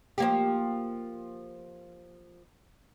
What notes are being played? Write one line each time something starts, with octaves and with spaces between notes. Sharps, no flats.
F3 A#3 G4